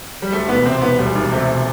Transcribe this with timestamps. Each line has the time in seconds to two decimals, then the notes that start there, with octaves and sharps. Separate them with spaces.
0.22 G3
0.32 D2 A3
0.48 E1 B3
0.65 C3 C4
0.82 E1 B3
0.98 D2 G3
1.15 E1
1.32 C3 A3